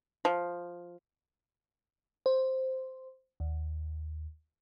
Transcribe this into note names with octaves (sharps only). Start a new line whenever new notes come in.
F3
C5
D#2